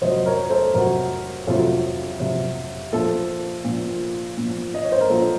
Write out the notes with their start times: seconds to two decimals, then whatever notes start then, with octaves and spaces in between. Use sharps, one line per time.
0.02 F2 C3 F#3 C5 D#5
0.26 A#4 C#5
0.50 A4 C5
0.74 F2 C3 F#3 F#4 A#4
1.47 F2 C3 F#3 F4 A4
2.20 F2 C3 F#3
2.92 A#2 F3 F4 A4
3.64 A#2 F3
4.37 A#2 F3
4.74 D#5
4.84 C#5
4.92 C5
5.01 A#4
5.10 A#2 F3 F4 A4